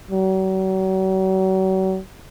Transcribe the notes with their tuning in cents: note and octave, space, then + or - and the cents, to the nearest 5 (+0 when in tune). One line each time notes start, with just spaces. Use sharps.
F#3 +40